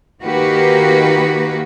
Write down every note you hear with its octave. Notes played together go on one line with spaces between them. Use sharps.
D#3 A#3 F#4 G4 B4